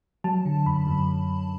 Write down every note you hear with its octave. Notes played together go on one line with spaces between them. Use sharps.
F#3 A5
D3
F#2 B5
F#2